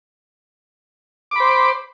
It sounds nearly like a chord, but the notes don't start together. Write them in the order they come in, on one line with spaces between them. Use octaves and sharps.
D6 B5 C5